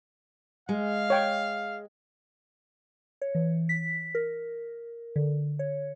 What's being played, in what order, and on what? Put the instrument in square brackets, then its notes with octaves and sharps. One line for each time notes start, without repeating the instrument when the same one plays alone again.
[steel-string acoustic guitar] G#3 [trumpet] F5
[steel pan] C#5 G5 C#6
[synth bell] C#5
E3
B6
A#4
D3
C#5